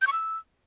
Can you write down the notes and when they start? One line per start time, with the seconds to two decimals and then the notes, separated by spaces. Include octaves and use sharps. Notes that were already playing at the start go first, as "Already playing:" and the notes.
0.02 G6
0.07 C#6
0.13 E6